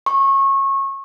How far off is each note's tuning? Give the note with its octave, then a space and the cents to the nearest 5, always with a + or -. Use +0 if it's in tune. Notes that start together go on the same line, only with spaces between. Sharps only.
C#6 -25